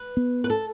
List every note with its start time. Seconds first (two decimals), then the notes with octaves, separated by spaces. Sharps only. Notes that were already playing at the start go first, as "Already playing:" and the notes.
Already playing: B4
0.17 B3
0.44 B4
0.50 A4